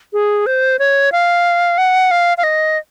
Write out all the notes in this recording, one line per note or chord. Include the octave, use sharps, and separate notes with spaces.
G#4
C5
C#5
F5
F#5
F5
F5
D#5